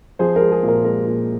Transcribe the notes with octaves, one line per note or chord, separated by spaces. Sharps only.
F3 G#4 C5
A#4
G#3
G#4
A#2
A#4
G#3 A#4
A#2